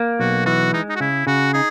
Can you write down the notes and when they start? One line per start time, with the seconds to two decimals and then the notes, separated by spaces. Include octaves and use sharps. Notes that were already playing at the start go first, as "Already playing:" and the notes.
Already playing: A#3
0.20 B1 F#4
0.46 E3 F#4
0.74 G#3 D#4
0.89 D#4
0.96 F#4
1.00 C#3 E4
1.27 C#3 F#4
1.54 D#4 G#4